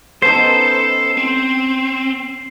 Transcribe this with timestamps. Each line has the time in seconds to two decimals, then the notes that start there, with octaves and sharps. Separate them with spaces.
0.22 B3 C#4 D#4 A4 C5 A5 C7
1.17 C4